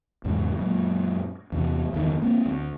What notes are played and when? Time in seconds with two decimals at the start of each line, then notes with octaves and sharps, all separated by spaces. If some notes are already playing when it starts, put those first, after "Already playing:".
0.24 G#1 E2 G#2 C#3
0.57 F#2 A#2
1.52 E2 C3 E3
1.92 F#1 E2 G#2 D#3
2.22 A#3 C4
2.46 D2